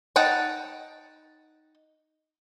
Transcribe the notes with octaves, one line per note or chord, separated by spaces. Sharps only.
D#4 F#5 G5 A5